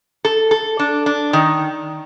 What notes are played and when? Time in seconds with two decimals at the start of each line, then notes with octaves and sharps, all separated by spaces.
0.25 A4
0.51 A4
0.79 D4
1.06 D4
1.33 D#3